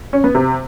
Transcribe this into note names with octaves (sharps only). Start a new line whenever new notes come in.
C#4
B3
C3